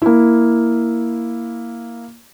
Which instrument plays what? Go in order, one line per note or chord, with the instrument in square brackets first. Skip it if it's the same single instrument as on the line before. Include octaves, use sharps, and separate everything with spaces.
[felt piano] A#3 E4